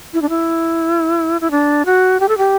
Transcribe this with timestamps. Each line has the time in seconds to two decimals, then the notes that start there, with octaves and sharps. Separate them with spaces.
0.13 E4
0.22 D4
0.29 E4
1.41 E4
1.51 D4
1.85 F#4
2.20 G4
2.28 A4
2.38 G4